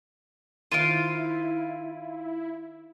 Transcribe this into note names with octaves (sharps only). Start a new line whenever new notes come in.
D#3 E4 F4 C5 F5 D7 D#7